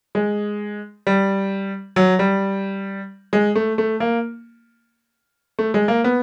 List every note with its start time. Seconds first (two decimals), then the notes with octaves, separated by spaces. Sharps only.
0.15 G#3
1.07 G3
1.96 F#3
2.19 G3
3.33 G#3
3.55 A3
3.78 A3
4.00 A#3
5.59 A3
5.74 G#3
5.88 A#3
6.04 B3